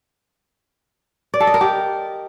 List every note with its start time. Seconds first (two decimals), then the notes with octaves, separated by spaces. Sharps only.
1.34 D5
1.40 A4
1.47 D#5
1.54 A#4
1.61 G4